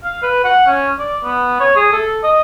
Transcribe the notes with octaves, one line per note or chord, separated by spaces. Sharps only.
F5
B4
F#5
C#4
D5
B3
C#5
G#4
A4
D#5